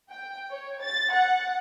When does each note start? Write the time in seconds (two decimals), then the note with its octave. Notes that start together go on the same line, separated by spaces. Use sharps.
0.10 G5
0.51 C#5
0.82 A6
1.13 F#5